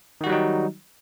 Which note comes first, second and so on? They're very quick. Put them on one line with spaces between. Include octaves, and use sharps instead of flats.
D#3 F#4 G3 F#3 D#4